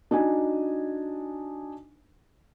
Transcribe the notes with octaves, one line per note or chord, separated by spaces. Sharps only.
D4 D#4 F#4 G#5